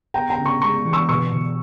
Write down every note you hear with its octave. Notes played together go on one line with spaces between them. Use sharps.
B3 G5 A#5
G5 A#5
C#3
A#5 C#6
G#3 A#5 C#6
E3
C#6 E6
B2 C#6 E6
B2